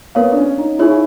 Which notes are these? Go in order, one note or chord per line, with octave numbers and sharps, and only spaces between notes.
B3 A#4 C#5 F5
D4
C#4
D#4
D#4 E4 G#4 C#5